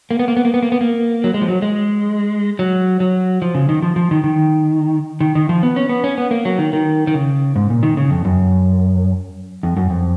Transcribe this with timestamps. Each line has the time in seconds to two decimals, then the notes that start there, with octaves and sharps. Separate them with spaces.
0.11 A#3
0.19 B3
0.28 A#3
0.37 B3
0.45 A#3
0.54 B3
0.63 A#3
0.72 B3
0.81 A#3
1.24 F#3
1.34 G#3
1.41 F3
1.48 F#3
1.62 G#3
2.59 F#3
3.00 F#3
3.42 F3
3.55 C#3
3.69 D#3
3.83 F3
3.96 F3
4.11 D#3
4.24 D#3
5.21 D#3
5.35 D#3
5.49 F3
5.63 B3
5.76 C#4
5.89 B3
6.04 C#4
6.18 B3
6.31 A#3
6.45 F#3
6.58 D#3
6.73 D#3
7.07 D#3
7.14 C#3
7.56 G#2
7.70 A#2
7.83 D#3
7.97 C#3
8.11 F2
8.25 F#2
9.63 F2
9.77 F#2
9.90 F2